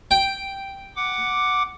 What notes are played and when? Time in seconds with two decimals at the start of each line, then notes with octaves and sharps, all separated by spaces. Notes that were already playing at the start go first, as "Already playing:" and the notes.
0.11 G5
0.96 F#5 D6